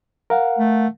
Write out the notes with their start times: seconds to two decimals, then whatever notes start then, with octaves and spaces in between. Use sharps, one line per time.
0.30 A#4 F5 F#5
0.58 A3